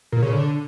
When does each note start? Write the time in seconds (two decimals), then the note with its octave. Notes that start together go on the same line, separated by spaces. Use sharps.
0.12 A#2
0.23 C#3
0.33 D3